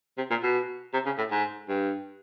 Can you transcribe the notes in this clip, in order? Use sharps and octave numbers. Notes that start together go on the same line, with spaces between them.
C3
A#2
B2
C3
C#3
A2
G#2
G2